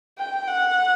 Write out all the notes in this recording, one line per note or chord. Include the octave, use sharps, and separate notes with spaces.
G5
F#5